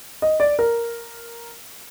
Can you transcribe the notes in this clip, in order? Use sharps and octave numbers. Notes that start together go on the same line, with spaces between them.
D#5
D5
A#4